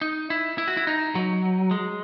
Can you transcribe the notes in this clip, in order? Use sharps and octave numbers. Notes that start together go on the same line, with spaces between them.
D#4
E4
E4
F#4
E4
D#4
F#3
G#3